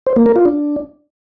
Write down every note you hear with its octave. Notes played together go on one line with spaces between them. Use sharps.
C5
A#3
A#4
F4
D4